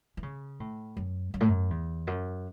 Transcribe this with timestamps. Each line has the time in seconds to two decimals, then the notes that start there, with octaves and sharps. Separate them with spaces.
0.17 E3
0.23 C#3
0.60 A2
0.97 F#2
1.34 F#2
1.40 A2
1.48 F#2
1.70 E2
2.07 F#2